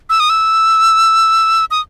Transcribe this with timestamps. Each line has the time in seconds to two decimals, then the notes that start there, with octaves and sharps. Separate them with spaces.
0.10 E6
0.20 D#6
0.30 E6
1.71 D#6